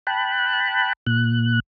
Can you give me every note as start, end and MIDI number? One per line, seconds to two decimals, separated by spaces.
0.07 0.93 79
0.07 0.93 81
0.07 0.93 83
0.07 0.93 90
1.07 1.60 46
1.07 1.60 90